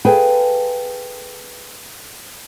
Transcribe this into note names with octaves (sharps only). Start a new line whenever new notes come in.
G#4 A4 B4 F5 G5 G#5